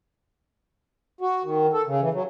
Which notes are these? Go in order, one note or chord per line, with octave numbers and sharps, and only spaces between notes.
F#4
D#3
A4
C#3
E3
F#3